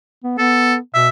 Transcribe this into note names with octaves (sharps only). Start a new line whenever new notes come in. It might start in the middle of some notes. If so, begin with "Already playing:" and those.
B3
B3 A4
B2 E5